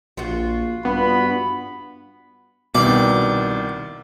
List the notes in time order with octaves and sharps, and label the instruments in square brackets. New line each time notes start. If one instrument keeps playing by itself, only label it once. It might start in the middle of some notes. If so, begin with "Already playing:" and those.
[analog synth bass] A#1 [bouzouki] F4 F#4
[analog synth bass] G2 [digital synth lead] B3 [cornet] B5
[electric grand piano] C2 D#3 [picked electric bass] B2 [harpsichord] D5